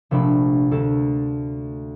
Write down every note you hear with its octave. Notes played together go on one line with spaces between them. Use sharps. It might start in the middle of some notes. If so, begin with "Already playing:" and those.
A#1 C3 A3 D4 B5
D2 A4